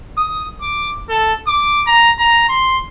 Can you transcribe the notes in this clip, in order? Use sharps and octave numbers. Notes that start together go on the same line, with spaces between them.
D#6
D6
A4
D6
A#5
A#5
C6